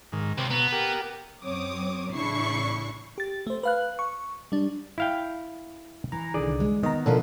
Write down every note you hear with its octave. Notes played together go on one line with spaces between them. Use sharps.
G#2 D#3
C#2 C3
B2 B3 A#5
G4 A#4
F#2 F#3 C4 C#5 D6 D#6
A1 C#3 D4 E4 C#6 C7
G4 A6
A3 C5
B4 F5 F#6
C#6
G3 D4
E4 F5 G5
E3 A#5
C2 D3 D#3 G#4 D5
G#3
D#3 B3 D#5 A#5
B2 D3 F3 A4 A#4